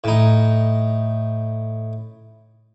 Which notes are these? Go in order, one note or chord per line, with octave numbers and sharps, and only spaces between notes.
A2 D#4